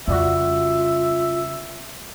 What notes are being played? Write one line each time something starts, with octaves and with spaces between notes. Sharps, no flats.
F2 C#3 G3 F4 F#4 E5